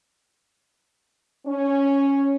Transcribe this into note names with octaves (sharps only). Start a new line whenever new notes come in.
C#4